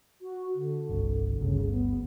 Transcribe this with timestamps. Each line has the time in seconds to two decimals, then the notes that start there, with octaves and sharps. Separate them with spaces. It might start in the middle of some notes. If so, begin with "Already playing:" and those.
0.22 F#4
0.55 D3
0.89 G1 C2
1.38 G1 D2 C#3
1.67 B3